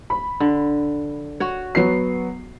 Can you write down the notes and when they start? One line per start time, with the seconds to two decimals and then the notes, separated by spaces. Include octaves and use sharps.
0.10 B5
0.40 D3
1.40 F#4 C#5
1.75 F#3 B3 C7